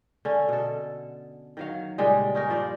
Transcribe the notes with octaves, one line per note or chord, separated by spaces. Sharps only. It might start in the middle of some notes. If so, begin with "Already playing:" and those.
D3 C#4
B2 A4
D#3 F#3 F5
A#2 C#3 G3 G#3
C#4 D#4 A#4
G2 F3 D5